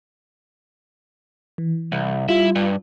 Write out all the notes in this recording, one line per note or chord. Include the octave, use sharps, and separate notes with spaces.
E3
C2
G3 E4 F4
G2